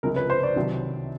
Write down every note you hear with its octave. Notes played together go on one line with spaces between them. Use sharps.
C#2 C3 F3 A#4
B4
C5
D5
C2 C3 D#3 F#3